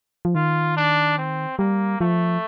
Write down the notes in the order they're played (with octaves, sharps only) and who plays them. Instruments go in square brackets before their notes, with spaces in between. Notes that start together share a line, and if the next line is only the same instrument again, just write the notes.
[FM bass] F3
[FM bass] D#3 [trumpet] F4
[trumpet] D4
C4
[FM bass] G3 [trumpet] A#3
[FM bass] F3 [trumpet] A3